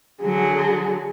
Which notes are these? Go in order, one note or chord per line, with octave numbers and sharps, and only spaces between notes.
D3 F#3 G#4